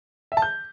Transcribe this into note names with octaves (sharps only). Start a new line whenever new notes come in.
E5
A5
G6